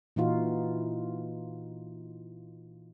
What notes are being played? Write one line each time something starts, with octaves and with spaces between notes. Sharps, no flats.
A#2 E3 D#4 F4 F#4